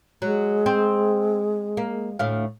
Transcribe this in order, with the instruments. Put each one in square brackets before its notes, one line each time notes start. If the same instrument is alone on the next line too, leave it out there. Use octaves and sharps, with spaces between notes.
[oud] F#3 [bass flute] G#3
[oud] C4
A#3
D2 A2 F5